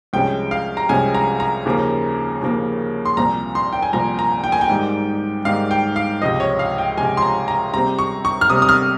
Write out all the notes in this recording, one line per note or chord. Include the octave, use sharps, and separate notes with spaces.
C2 C3 F3 G#3 C#4 G5
F5
A#5
C2 C3 F3 G#3 C#4 G#5
A#5
A#5
D#2 C#3 F3 A#3 C#4
D#2 C#3 F3 A#3 C#4
C6
C2 A#2 F3 C4 A#5
C6
G5
G#5
C2 A#2 F3 C4 A#5
A#5
G5
G#5
G5
G#2 D#3 G3
G#2 D#3 G3 F5
G5
F5
C#2 C3 F3 D#5
C#5
F5
G5
C#2 C3 F3 G#5
C6
A#5
A#5
C3 G3 C4 A#5
C#6
C#6
F6
C3 G3 C4 D#6
D#6
F6